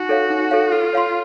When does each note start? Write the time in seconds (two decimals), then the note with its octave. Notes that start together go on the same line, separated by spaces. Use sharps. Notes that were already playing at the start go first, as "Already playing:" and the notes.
Already playing: D#4 F#4
0.09 A4 C#5 F5
0.30 D#4
0.51 A4 C#5 F5
0.72 F4 A4
0.93 C#5 F5 C6